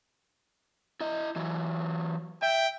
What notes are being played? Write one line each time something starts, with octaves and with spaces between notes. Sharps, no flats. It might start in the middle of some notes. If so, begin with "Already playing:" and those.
E4 D#5
E3 F#3
E5 G5